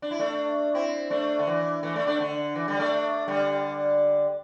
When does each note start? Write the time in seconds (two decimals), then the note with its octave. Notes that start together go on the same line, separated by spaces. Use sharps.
0.02 D4
0.11 E4
0.19 A3 D4
0.74 C4 E4
1.10 A3 D4
1.39 D3
1.47 E3
1.83 E3 A3
1.96 A3 D4
2.07 A3 D4
2.20 D3
2.55 E3
2.68 D3 G3
2.80 A3 D4
3.28 D3 G3